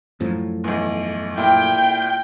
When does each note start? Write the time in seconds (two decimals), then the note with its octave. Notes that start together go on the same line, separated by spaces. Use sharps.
0.20 F#2 A2 F3
0.64 B1 E2
1.37 A#2 E4 G5